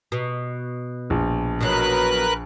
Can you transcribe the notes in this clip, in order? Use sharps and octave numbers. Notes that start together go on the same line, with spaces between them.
B2
A#1
B2 F#3 A#4 B4 F#6